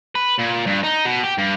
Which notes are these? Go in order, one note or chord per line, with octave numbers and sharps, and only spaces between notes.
B4
A#2
G2
D#4
B2
G4
G2